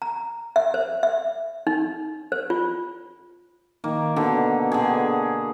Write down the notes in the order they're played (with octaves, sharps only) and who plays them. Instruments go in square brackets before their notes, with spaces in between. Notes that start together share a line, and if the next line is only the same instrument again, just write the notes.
[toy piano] A#5
E5
C5
E5
D#4
C5
F4
[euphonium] D#3 [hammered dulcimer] A#3
[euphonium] B2 [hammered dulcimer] D3
[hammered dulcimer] D3 G#4